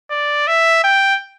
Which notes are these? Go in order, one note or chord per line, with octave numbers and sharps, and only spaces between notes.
D5
E5
G5